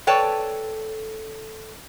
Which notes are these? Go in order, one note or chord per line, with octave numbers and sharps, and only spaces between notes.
A4 B4 C#5 D5 G5 A5